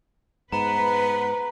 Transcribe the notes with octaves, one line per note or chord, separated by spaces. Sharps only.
G#2 B3 B4 A#5